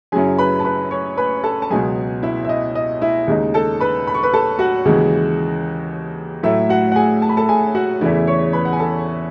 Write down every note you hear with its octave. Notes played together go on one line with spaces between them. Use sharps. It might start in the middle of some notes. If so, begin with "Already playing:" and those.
F#2 C#3 F#3 C#4 E4 G#4 G#5
B4 B5
A5
B4 B5
C#5 C#6
B4 B5
A4 A5
A5
C#2 B2 F#3 G#4 G#5
E4 E5
E5
D#5
D#5
E4 E5
D#2 C#3 G#3 D#4
A4 A5
B4 B5
B5
C#6
B4 B5
A4 A5
F#4 F#5
D#2 C#3 E3 G#3
A2 F#3 A3 E4 E5
F#4 F#5
F#5
G#4 G#5
A5
B5
A4 A5
G#4 G#5
F#4 F#5
E2 C#3 E3 A3 E4 E5
C#5 C#6
B4 B5
F#5
G#5
A4 A5